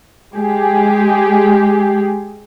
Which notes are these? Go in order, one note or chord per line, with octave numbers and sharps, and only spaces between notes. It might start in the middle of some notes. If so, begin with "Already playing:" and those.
G#3 G4 G#4